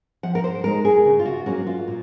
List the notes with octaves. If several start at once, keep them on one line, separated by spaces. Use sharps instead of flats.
F3 F#5
A#4
C5
G#3 D#4 A#4
G#4
C#3
F4
F#4
F#3 A#3 C#4 F#4
F4
A#2